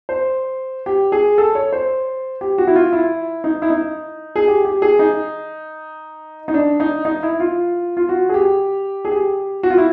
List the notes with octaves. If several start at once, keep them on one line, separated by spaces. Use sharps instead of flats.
C5
G4
G#4
A4
C#5
C5
G4
F#4
E4
F4
E4
D#4
E4
D#4
G#4
G4
G4
G#4
D#4
D#4
D4
D#4
D#4
E4
F4
F4
F#4
G#4
G4
G#4
G4
F#4
F4
E4